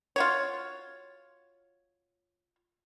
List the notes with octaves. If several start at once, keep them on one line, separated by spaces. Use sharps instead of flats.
F4 F#4 C#5